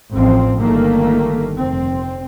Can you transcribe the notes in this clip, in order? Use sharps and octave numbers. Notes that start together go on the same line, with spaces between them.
A1 F3 C4
G1 D#3 A3 A#3
F1 C4